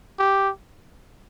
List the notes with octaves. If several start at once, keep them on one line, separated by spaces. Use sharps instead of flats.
G4